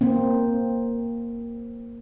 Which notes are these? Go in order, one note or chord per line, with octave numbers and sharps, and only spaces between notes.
A#3 C4